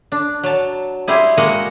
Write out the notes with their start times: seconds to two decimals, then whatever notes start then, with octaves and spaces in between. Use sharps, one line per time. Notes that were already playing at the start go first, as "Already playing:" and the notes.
0.12 D4
0.43 F#3 A5
1.08 G3 C4 E4 G#4
1.37 G#3 A#3 F#4 D#5 F#5